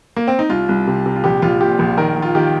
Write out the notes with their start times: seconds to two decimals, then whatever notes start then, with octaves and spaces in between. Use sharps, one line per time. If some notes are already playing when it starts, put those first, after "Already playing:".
0.16 A#3
0.27 C4
0.39 D#4
0.49 C2 F4
0.69 C2
0.87 C3
1.06 C3
1.16 F4
1.24 A#1 G4
1.42 A#1 F4
1.61 A#2 G4
1.79 A#1
1.97 D#3 A#4
2.15 D#3
2.22 F4
2.35 D#3 G4